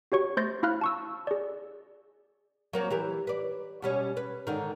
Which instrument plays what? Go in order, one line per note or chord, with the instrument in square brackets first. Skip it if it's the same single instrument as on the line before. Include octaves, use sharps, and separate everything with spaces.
[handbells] F#4 G4 C#5 C#6
A3 C5 C6 G6 A6 A#6
E4 F5 B5 F6 F#6
A5 C#6 E6
G#4 D5
[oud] F#3 A#3 C4
E3 G4 A#4
B4 D5
B2 G3 C#4
B4
G#2 D3 D#3